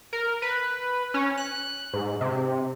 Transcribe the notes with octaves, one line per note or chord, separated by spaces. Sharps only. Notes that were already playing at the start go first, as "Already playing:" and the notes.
A#4
B4
C#4
F#6
G#2
C3